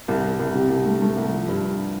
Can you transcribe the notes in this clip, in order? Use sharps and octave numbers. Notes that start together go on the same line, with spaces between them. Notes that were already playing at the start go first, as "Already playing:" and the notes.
C2
C2
C2
C3
C2
A3
A3
C2
F3
G2
G2